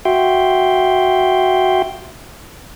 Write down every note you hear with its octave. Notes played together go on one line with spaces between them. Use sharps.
F#4 E5 G5 C6